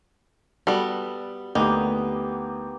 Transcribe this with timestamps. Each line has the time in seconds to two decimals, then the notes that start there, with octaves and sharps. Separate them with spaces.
0.67 G3 B3 F#4 A4
1.55 D2 A#3 B3 D#4 G4